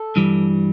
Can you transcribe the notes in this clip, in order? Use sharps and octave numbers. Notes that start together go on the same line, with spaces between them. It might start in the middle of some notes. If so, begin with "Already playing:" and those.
Already playing: A4
G2 E3 G3